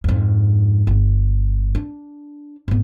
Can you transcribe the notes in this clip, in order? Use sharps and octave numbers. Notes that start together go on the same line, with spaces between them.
F2 G#2
G1
D4
G#1 B3